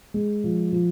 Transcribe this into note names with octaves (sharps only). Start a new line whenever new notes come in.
G#3
F3
F3